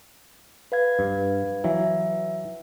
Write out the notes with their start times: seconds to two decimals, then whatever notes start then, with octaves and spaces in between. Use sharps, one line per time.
0.72 B4 F5 G#6
0.99 G2
1.64 E3 F#3 E5